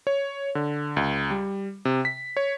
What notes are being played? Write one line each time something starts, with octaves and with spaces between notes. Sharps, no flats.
C#5
D3
C#2
G3
C3
B6
C#5